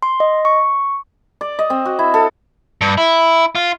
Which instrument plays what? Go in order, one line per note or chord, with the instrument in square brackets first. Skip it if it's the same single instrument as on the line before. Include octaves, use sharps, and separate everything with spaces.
[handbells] C6
D#5
C#6
[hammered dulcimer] D5
D#5
C4
F#4
E4
A4
[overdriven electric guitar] G2
E4
F4